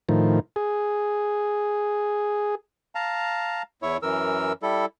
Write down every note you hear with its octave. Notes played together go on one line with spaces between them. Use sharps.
A2 D#3 F3
G#4
F5 A5 A#5
E2 E4 C#5
F#2 E3 A#4 E6
G3 E4 A4